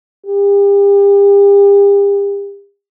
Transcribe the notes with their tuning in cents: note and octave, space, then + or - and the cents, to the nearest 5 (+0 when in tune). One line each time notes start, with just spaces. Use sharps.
G4 +40